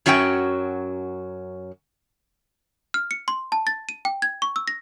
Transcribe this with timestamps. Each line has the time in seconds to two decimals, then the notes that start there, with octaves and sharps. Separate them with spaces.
0.06 F#2 F#3 C#4 F#4 G5
2.94 F6
3.11 C#7
3.28 C6
3.52 A5
3.67 A6
3.89 D#7
4.05 G5
4.22 G#6
4.42 C#6
4.56 E6
4.68 A#6